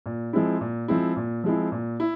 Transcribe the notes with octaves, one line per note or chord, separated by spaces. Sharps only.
A#2
F3 G#3 C4 E4
A#2
F3 G#3 C4 E4
A#2
F3 G#3 C4 E4
A#2
E4